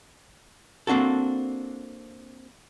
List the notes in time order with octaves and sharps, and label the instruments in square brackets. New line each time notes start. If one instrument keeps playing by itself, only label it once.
[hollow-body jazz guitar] A#3 C4 D4 F#4 A4